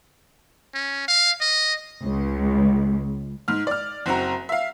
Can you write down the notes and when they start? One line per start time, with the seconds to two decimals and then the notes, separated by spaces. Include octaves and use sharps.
0.74 C#4
1.08 F5
1.40 D#5
2.03 C#2
3.48 G#2 F6
3.67 D5 F6
4.06 F#1 C4 F#4 A#5
4.49 E5 F5